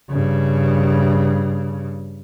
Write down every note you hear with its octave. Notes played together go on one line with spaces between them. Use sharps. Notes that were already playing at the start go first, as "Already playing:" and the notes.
G2 C#3